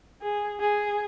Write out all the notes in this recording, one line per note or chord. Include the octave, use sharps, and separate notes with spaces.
G#4
G#4